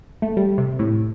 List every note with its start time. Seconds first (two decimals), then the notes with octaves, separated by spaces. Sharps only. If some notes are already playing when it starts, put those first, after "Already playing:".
0.22 A3
0.37 G3
0.58 C3
0.79 A2